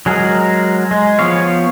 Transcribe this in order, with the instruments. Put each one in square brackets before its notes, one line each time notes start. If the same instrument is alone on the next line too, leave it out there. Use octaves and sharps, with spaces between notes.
[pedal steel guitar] F#3 G#3 G#4 A#4
G#3
F3 B3 C#5 F5